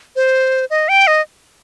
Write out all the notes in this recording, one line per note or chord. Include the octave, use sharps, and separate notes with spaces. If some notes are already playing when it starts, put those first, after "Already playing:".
C5
D#5
G5
D#5